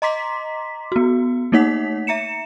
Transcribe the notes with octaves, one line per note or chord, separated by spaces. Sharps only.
D#5 A#5 C6 D6 B6
B3 F#4
A3 A#3 D#4 C#5 F#5 B6
E5 A#5 C#7 E7